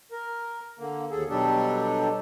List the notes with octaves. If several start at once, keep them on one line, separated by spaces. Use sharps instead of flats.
A#4
D3 A#3
D#2 G#4 A4
B2 F#3 G3 D4 G4 A4